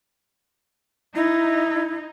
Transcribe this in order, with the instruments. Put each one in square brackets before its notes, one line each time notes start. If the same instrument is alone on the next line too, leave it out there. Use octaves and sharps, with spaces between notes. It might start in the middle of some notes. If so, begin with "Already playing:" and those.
[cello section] D#4 [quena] E4